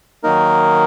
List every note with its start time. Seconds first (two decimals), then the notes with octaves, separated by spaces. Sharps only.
0.23 D#3 F#3 A#3 D#4 A#4